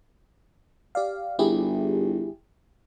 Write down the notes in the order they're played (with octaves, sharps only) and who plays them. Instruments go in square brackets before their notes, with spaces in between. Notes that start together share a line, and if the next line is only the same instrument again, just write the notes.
[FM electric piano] G4 D5 F5
[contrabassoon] G1 [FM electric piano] E4 G4 G#4